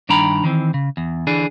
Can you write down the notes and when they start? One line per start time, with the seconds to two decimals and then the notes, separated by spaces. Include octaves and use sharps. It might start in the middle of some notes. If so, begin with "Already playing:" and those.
0.09 G2 D#3 D4 G5 A#5 B5
0.44 D#3 E3 C4
0.74 C#3
0.97 E2
1.27 D3 E3 D4 G#4